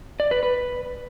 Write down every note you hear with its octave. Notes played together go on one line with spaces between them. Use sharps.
D5
B4
B4